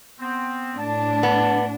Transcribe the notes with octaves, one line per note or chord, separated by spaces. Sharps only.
B3 C4
A2 D4 A5
B3